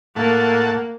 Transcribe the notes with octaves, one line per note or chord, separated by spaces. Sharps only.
A2 A#3 F#5 A5